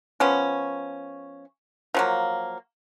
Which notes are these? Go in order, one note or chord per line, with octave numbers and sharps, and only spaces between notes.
F3 B3 C#4
F3 F#3 A#3